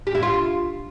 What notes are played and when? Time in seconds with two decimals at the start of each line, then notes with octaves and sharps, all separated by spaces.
0.07 G4
0.15 E4
0.23 F4